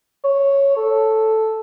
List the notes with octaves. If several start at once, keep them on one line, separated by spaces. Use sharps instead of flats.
C#5
A4